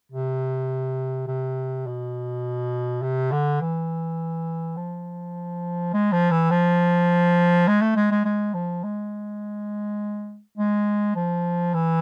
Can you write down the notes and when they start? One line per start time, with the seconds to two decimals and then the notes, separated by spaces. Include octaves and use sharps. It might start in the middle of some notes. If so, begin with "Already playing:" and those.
0.12 C3
1.27 C3
1.87 B2
3.02 C3
3.32 D3
3.61 E3
4.77 F3
5.93 G#3
6.12 F3
6.31 E3
6.51 F3
7.68 G#3
7.82 A3
7.96 G#3
8.11 G#3
8.25 G#3
8.54 F3
8.84 G#3
10.58 G#3
11.16 F3
11.74 E3